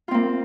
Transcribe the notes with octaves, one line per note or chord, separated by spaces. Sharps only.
A#3 C4 F4